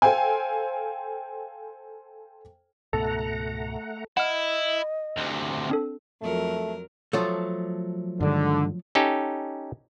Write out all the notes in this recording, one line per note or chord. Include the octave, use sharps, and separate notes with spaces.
A4 C5 F5 G5 G#5
C#2 G#2 B2 A3 A4 F#5 A#5
E4 D#5 F#5 F6
D2 C3
C4 D4 A4
F2 F#3 A3 A#4
F3 F#3 A3
G2 D3 D#3 G#3
C#4 D#4 G4 A4